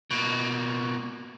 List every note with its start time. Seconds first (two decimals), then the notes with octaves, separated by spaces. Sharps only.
0.11 B2 A#3